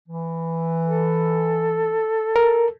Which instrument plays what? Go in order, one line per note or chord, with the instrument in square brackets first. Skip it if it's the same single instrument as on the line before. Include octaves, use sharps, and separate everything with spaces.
[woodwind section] E3
[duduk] A4
[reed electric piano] A#4